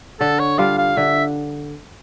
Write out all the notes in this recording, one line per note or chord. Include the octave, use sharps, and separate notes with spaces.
D3 A4
C#5
G3 D4 F4 F5
F5
D3 E5